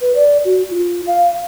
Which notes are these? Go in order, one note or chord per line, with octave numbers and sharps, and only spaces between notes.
B4
D5
F#4
F4
F5